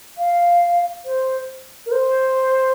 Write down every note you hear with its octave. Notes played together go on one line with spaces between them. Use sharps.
F5
C5
A#4
C5